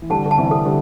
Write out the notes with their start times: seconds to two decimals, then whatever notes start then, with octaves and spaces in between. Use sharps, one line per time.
0.02 E3
0.10 D3 G3 A5
0.26 D3
0.31 A5
0.38 C3 E3
0.51 A4
0.65 D3 G3